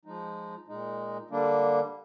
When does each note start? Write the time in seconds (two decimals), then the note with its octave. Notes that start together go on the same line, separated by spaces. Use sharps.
0.05 F3 G#3 D#4
0.68 A#2 G#3 D#4
1.30 D3 G3 A#3 D4